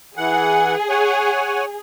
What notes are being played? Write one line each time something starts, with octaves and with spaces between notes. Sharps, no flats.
E3 G#4 F#5
C#5 F#5 G#5